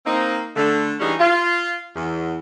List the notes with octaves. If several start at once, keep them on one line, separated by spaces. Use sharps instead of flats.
A#3 C4 D#4
D3 A3
D3 E3 G3 C#4 D#4 G#4
F4
E2